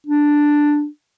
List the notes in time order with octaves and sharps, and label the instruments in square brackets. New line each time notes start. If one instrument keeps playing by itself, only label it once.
[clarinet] D4